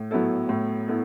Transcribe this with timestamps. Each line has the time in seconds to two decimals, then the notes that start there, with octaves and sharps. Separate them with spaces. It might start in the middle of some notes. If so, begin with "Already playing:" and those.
Already playing: A2
0.11 F#3 B3 E4 A4
0.49 A2
0.88 B3 E4 A4